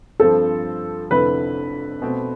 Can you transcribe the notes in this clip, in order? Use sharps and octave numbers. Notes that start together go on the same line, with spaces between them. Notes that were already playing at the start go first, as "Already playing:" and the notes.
G2 F3 C4 A4
F1 F2 D3 A3 E4 B4
B2 A3 C4